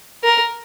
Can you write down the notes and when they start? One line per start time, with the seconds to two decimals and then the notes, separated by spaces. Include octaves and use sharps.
0.24 A#4